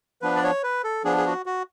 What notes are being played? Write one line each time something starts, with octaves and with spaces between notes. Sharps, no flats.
F3 B3 D4 B4
D5
C#5
B4
A4
F3 B3 D4 G#4
G#4
F#4
F#4